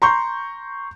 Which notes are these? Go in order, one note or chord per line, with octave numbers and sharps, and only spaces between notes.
A#5 C6 C#6 G6